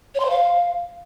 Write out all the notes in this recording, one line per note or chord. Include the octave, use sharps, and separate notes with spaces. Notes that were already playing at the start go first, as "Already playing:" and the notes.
C#5
C6
C5
F5